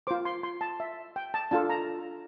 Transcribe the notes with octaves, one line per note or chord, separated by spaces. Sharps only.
F4 C5 D6
C6
C6
A5
E5
G5
A5
D4 F4 A4 A5
A#5